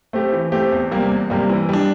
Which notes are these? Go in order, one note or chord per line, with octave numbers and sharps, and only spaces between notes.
A3 C4 G4
E3
A3 C4 G4
E2
C3 G3 A#3
E2
C3 G3 A#3
E3
G3 D4